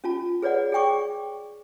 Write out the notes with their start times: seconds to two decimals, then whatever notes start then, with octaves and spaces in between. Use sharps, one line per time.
0.04 C#4 F4 A5
0.42 G#4 B4 C#5 D5 F#5
0.72 G#4 D5 G5 C#6 D6